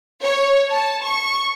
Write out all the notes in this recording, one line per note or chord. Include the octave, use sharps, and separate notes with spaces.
C#5
A5
C#6